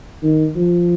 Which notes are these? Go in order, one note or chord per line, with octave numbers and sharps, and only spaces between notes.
D#3
F3